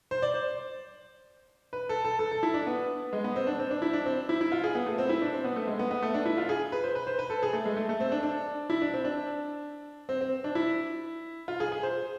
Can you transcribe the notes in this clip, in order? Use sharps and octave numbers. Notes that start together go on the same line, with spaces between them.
C5
D5
C5
B4
A4
A4
A4
A4
E4
D4
B3
G#3
B3
C4
D4
C4
D4
E4
D4
C4
E4
E4
F4
G#4
B3
A3
C4
E4
D4
C4
B3
A3
G#3
B3
B3
A3
D4
E4
F4
G#4
B4
C5
B4
C5
B4
A4
G#4
A3
G#3
A3
A3
C4
D4
D4
E4
D4
C4
D4
C4
C4
D4
E4
F4
G#4
G#4
C5